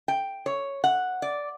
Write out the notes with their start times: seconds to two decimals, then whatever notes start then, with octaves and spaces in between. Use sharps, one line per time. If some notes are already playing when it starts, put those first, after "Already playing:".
0.08 G5
0.46 C#5
0.84 F#5
1.22 D5